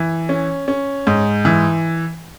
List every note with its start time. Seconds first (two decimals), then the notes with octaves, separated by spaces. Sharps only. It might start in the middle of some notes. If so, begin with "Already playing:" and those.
Already playing: E3
0.29 C#4
0.68 C#4
1.07 G#2
1.45 E3